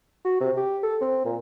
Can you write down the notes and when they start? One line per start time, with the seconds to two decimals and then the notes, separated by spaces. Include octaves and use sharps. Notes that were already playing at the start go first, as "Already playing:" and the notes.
0.25 F#4
0.40 C3
0.57 G4
0.83 A4
1.01 C4
1.25 A#2